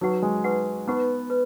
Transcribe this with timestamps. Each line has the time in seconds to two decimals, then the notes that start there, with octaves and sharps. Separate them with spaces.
0.01 F#3 D#4 B4 F#5 C#6
0.22 G#3
0.44 D#4 B4 F#5 C#6
0.87 B3 D#4 B4 F#5 C#6
1.30 B4